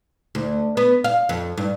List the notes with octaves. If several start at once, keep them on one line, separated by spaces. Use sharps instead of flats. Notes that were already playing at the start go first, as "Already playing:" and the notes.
D2
B3
F5
F2
G2